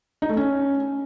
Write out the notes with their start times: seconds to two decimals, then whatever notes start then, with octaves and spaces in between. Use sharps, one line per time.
0.22 D#4
0.29 A3
0.37 C#4